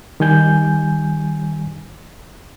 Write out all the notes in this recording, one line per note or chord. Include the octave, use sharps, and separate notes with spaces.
D#3 G3 G#5 G6